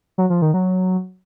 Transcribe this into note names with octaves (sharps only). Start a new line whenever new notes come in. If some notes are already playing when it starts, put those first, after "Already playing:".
F#3
F3
D#3
F#3